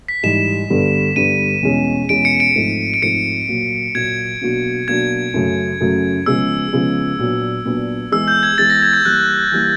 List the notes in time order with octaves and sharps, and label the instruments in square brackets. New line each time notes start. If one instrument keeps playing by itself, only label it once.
[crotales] B6
[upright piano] G#2 E3 G3 [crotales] E7
[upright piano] G2 D3 G3 B3
[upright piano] G2 D3 G3 B3 [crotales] D#7
[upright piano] E2 B2 G#3 C#4
[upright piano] E2 B2 G#3 C#4 [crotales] D7
[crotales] C#7
D7
[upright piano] G#2 F3 A3 C4
[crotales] D7
[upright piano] G#2 F3 A3 C4 [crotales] C#7
[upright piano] A#2 F#3 A#3
[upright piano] A#2 F#3 A#3 [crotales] G#6
[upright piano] B2 F#3 A#3 D4 F#4
[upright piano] B2 F#3 A#3 D4 F#4 [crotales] G#6
[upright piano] F#2 C#3 F#3 A3
F#2 C#3 F#3 A3
[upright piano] C#3 F3 G#3 B3 [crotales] E6
[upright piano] C#3 F3 G#3 B3
A#2 F#3 B3 D4
A#2 F#3 B3 D4
[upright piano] E3 G#3 B3 E4 [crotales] E6
[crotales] G6
G#6
[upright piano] E3 G#3 B3 E4 [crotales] A6
[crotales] A#6
G#6
G6
[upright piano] E3 G3 A#3 [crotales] F#6
[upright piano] E3 G3 A#3